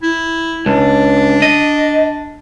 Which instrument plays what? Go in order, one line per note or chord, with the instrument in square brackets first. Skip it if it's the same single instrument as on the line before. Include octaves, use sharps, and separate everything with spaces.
[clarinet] E4
[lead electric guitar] C#2 [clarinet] D4
[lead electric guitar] D#5